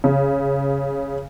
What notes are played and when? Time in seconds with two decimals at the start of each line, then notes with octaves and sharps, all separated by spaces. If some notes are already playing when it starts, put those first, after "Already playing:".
0.04 C#3